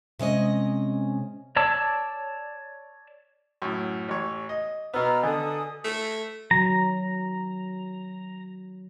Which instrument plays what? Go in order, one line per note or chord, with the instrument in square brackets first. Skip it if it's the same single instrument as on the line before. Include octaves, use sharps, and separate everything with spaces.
[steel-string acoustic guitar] C3 G#3 C#4 D#5
[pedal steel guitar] C#5 D5 A5 D6 E6
[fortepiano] F#2 A2
A1 C#5
D#5
[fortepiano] B2 B3 [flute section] A#5 E6 F6
[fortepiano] D3 [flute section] A4 G#5 D#6
[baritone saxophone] A3
[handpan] D#3 F#3 [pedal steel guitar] A#5